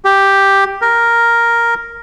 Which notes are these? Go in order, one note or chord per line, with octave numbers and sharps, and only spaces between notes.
G4
A#4